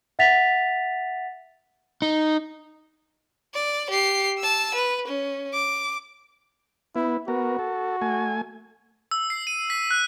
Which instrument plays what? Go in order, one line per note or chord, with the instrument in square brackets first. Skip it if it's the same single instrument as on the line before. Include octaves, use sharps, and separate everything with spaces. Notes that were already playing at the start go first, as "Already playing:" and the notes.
[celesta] E5 F#5 A6 B6 F7
[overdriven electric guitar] D#4
[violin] D5
G4 C7
A5 E6
B4
C#4
D6
[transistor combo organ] B3 [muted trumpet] E4
[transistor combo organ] B3 A#4 [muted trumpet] F#4
[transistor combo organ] A4
A3 G#5
[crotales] E6
C7
D#7
B6
F#6